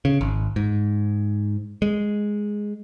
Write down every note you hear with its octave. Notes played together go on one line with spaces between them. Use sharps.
C#3
G#1
G#2
G#3